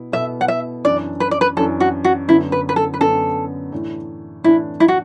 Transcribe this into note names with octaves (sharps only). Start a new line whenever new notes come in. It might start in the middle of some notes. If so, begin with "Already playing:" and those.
Already playing: B2 B3 E4
B2 B3 E4 A4 E5
F#5
E5
F#2 E3 D4 D5
B4
D5
B4
F#2 E3 D4 A4
F#4
F#4
F#2 D3 B3 E4
B4
B4
A4
B4
F#2 D3 B3 A4
A2 E3 D4
A2 E3 D4 E4
E4
F#4